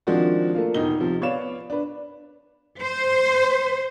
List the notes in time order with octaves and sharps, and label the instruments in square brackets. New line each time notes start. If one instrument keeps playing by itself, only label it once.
[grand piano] D#3 F3 G#3 C4 D4 F#4
A3 A#3 F4
E1 D#4 G7
C3 F3
B3 C#5 D5 F5 E7
D4 B4
[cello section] C5